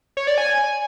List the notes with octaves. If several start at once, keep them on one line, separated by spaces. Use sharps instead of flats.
C#5
D5
G#5